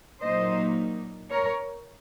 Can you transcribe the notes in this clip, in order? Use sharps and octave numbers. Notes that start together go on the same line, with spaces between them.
A#2 F#3 A#3 D#4 C5 D#5
A#4 C#5